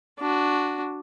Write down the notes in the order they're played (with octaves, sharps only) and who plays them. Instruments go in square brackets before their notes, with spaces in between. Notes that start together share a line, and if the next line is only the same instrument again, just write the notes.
[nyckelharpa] D4 F#4